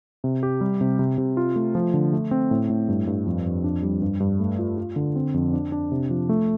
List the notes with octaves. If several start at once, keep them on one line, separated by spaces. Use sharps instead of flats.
C3
G4
G3
C3
C3
C3
F4
A3
F3
D3
A3
C4
A2
A2
G2
G2
F2
F2
D4
G3
G2
G2
A3
F4
F4
D3
C4
F2
D4
D4
C3
F3
A3